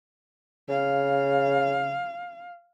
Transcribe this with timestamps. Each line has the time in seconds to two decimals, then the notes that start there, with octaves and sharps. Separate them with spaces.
0.69 C#3 F5